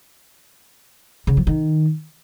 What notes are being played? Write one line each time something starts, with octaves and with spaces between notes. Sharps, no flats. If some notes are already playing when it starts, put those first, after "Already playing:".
C#3
F3
D#3